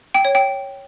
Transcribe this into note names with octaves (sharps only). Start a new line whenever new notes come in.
G5
C#5
G5